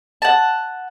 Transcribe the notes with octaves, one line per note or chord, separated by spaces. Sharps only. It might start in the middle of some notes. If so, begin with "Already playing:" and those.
F#5 A5